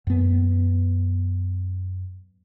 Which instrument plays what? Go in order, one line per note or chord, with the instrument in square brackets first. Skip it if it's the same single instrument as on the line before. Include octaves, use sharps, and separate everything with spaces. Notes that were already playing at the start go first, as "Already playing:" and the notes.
[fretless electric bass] F#2 B3